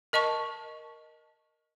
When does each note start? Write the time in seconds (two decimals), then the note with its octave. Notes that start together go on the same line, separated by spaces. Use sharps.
0.13 A#4 D#5 A5 C#6